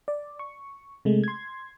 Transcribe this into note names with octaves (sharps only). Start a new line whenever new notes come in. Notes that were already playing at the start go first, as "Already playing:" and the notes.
D5
C#6
C3 G#3 A3
C6 G#6